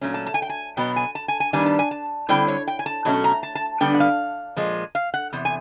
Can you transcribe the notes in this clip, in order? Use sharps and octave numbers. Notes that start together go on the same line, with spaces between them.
A#2 F#3 A3 C#4
A5
A5
G#5
G5
G#5
B2 F#3 B3 G5
G#5
A5
G#5
G#5
G2 D#3 G3 B3 D4 G#5
A5
G#5
A5
D3 G3 C4 E4 G5
C#5
G5
G#5
A5
B2 F#3 A3 C#4
A#5
A5
A5
D3 G3 B3 D4 G5
F#5
F5
A#2 F3 G#3
F5
F#5
E2 C3
G#5